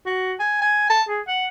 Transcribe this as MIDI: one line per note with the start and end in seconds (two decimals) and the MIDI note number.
0.06 0.33 66
0.40 0.60 80
0.62 0.85 80
0.90 1.03 81
1.09 1.21 68
1.28 1.48 78